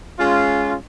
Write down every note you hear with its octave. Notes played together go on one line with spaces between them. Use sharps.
G#3 C#4 F4